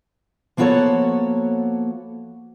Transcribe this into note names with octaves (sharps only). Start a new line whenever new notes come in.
F3 A#3 B3 F#4 A4 C#5